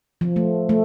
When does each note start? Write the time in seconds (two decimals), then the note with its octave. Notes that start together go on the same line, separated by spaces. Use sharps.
0.21 F3
0.36 A3
0.69 A3